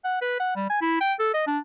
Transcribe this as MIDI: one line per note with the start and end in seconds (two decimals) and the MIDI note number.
0.04 0.18 78
0.21 0.36 71
0.40 0.54 78
0.56 0.65 55
0.70 0.78 80
0.81 0.96 64
1.00 1.13 79
1.19 1.31 69
1.34 1.44 75
1.47 1.59 62